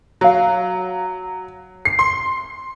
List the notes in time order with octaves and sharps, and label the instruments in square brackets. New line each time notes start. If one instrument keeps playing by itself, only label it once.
[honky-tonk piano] F#3 [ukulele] F#4 F5
[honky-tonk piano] C7
C6